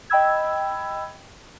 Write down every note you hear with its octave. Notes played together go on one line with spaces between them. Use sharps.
D#5 G5 B5 E6 G#6